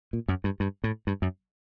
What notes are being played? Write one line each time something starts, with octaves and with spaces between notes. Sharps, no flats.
A#2
F#2
G2
G2
A2
G2
F#2